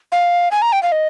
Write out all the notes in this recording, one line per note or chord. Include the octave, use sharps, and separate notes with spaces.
F5
G#5
A#5
G5
F5
D#5